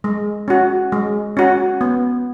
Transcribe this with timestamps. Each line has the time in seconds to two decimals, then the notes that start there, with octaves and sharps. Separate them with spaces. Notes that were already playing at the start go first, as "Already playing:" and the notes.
0.04 G#3
0.48 C#4 F#4
0.92 G#3
1.37 C#4 F#4
1.81 B3